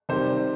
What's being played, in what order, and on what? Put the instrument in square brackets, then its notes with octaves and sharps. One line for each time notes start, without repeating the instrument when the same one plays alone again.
[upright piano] C3 D#3 G3 C5